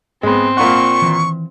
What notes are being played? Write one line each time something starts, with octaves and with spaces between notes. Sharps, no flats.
G#2 G#3 B3 C4
A#2 F4 F#5 C#6
D#3 E3